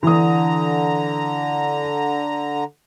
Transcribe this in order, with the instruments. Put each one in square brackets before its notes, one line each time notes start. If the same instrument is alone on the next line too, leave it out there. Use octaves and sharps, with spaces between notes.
[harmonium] D3 A#5 [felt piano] E3 D#6